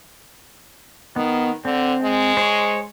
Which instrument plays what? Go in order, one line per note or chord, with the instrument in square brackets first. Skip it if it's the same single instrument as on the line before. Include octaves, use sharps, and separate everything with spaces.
[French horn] D#3 [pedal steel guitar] B3
[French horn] D3 [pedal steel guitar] C4
[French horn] G#3
[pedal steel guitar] C5 C#5